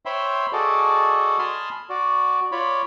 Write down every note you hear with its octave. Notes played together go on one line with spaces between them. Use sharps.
C5 C#5 E5 G5 B5 C6
F#4 G#4 A4 D5 D#5
G#5 A5 B5 C6 D#6 F6
F#4 D5
F4 C#5 D5 B5